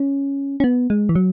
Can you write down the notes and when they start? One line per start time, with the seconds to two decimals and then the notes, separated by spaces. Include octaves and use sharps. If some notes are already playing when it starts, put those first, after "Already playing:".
Already playing: C#4
0.60 C#4
0.64 B3
0.90 G#3
1.09 E3
1.15 F#3